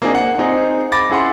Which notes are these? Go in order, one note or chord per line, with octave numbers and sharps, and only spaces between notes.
A#3 C4 D4 D#4 G#4
F#5
C4 D#4 G#4 C5
B5 D6 A6 A#6
C#4 E4 G#4 F#5 C6